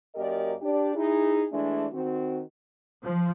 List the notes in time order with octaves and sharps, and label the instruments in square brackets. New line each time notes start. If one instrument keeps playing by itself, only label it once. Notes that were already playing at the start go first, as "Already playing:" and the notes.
[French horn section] F#2 A#3 G4 A#4 D5 D#5
D4 G4 D5
D#4 E4 G#4
E3 G#3 A3 D4
D#3 C4 F#4
[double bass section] F3